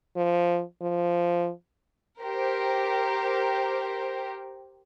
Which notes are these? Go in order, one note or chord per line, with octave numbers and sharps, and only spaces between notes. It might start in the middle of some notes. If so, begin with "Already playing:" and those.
F3
F3
G4 A#4 C5